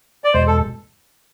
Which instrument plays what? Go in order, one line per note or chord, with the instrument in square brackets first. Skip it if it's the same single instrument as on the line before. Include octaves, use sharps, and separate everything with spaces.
[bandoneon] D5
[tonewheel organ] E2 B2 G#3 [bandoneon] C5
[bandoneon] A4